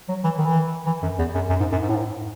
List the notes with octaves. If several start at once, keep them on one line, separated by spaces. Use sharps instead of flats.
F#3
E3
D#3
E3
E3
F#2
E2
F#2
F#2
G#2
F#2
G#2
A2
G#2